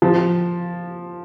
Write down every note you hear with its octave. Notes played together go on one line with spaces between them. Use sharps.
F3